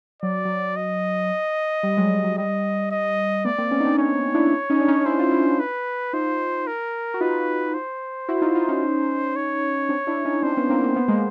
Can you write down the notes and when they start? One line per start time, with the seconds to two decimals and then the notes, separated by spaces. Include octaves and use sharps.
0.22 F#3 D5
0.45 F#3
0.76 D#5
1.83 G3
1.97 F#3 G#3
2.24 F#3
2.38 G3 D#5
2.91 D#5
3.45 A3 B3 D5
3.58 A#3 C4
3.71 B3 C#4
3.80 D#4
3.85 C4 D4
3.98 C#4 D#4 C#5
4.34 D4 E4
4.70 C#4 D#4
4.81 D4
4.88 C#4 D#4
5.06 E4 C5
5.19 F4
5.31 D4 E4
5.59 B4
6.13 D#4 F4 C5
6.67 A#4
7.14 F#4
7.21 D#4 F4 B4
7.74 C5
8.28 E4 F#4
8.42 D#4 F4
8.55 D#4 F4
8.68 C#4 D#4
9.36 C#5
9.89 C4 D4
10.07 D4 E4
10.25 C#4 D#4
10.42 C4 D4 C5
10.57 B3 C#4
10.69 A#3 C4
10.84 A#3
10.96 B3
11.08 G#3 A#3